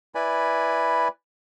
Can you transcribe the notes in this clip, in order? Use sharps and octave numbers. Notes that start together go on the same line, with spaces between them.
E4 B4 D5 G#5 B5